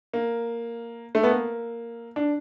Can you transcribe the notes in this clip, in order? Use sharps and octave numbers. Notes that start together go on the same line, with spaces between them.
A#3
A3
B3
A#3
D4